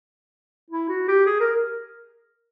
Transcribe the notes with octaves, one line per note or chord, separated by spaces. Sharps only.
E4
F#4
G4
G#4
A#4